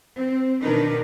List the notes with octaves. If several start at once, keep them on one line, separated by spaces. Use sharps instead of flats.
C4
B2 D#3 D4 D#4 A#4 B4